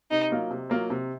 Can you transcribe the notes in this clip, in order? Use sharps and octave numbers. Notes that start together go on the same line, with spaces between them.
C3 D#4
F#3 A#3 F4
C3
F#3 A#3 F4
C3